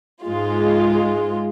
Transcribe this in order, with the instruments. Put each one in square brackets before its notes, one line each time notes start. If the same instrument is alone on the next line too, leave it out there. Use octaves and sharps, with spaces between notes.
[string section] G#2 G#3 F4